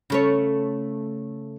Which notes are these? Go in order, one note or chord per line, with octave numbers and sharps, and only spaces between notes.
C#3 A3 C#5